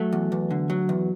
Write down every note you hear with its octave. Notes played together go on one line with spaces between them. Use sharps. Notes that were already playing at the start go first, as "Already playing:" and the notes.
Already playing: F#3 A3
E2
E2
D3
F#3
E2